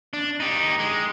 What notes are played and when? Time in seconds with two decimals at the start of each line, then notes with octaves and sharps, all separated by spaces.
0.13 D4
0.40 D#4 G4
0.79 G#3